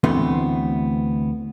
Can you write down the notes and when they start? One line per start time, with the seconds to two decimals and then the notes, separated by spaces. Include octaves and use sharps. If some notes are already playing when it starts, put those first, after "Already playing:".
0.04 D2 E3 A3 B3 C4